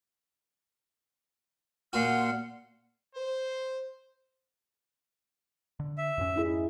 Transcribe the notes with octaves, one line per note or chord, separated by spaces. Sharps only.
A#2 F#4 F#5 C6 F6
C5
D3
E5
F2 G#2 C#4
D#4 E4 G#4